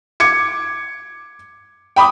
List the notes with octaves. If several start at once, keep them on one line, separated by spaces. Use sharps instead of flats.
D6 G#6 C#7
G5 B5 D6 D#6